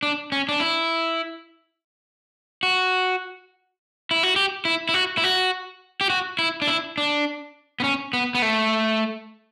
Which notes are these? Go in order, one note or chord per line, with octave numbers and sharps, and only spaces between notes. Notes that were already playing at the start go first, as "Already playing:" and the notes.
D4
C#4
D4
E4
F#4
E4
F#4
G4
E4
E4
F#4
E4
F#4
G4
F#4
E4
D4
E4
D4
B3
C#4
B3
B3
A3